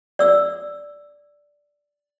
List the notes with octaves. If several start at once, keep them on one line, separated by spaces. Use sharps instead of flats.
D5 E6